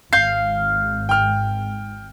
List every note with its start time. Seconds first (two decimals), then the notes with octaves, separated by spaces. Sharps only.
0.13 G#1 F5 G6 C7
1.09 G5 F6